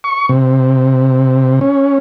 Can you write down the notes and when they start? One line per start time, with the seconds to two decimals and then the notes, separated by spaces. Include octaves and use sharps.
0.04 C#6
0.29 C3
1.61 C#4